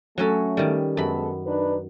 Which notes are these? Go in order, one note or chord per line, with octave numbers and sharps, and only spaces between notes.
F#3 A3 C#4 A4
D#3 G3
F#2 G#3 B3 A4 B5
D4 D#4 B4